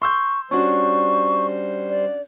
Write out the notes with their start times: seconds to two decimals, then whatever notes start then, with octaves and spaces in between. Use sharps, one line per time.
0.02 C6 C#6 E6 G6
0.51 G3 C#4 D4 F#4 C5 C#6
1.90 D5